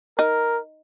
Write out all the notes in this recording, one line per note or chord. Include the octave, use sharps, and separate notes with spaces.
D#4 A#4